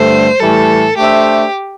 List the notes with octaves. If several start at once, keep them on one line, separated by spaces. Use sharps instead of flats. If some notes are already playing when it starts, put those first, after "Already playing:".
Already playing: G2 D3 A3 C5
A2 E3 G3 A4
A3 D4 G4 C5 E5